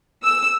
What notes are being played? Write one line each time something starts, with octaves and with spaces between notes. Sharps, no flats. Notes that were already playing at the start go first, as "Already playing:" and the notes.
E6